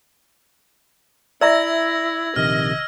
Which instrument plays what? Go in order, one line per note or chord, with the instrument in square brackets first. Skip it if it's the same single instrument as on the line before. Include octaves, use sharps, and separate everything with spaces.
[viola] E4 [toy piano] D5 E5 A#5 [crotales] E6 G#6 A#6
[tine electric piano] A#1 C3 D#3 [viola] D#5 [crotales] F6